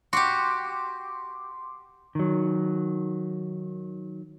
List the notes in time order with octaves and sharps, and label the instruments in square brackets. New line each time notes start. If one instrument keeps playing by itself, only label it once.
[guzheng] F#4 G4 [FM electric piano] C6 D6
[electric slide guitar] D#3 F#3